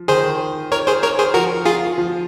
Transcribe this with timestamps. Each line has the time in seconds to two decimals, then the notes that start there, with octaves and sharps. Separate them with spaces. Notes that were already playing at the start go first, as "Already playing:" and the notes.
Already playing: F3
0.08 D#3 G#4 C5
0.72 A#4 C#5
0.87 G#4 C5
1.03 A#4 C#5
1.19 G#4 C5
1.34 F3 F#4 A#4
1.66 F4 G#4
1.98 F3